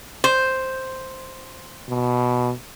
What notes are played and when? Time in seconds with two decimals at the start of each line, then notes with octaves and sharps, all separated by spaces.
0.24 C5
1.89 B2